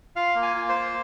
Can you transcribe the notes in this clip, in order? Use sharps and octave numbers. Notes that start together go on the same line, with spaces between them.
F4 F5
A#3
G#5
F4
C5
A#3